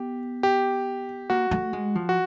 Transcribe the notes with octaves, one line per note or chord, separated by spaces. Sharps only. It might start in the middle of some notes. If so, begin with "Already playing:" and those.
Already playing: B3 G4
G4
A#3 F#4
A3
G#3
F3
F#4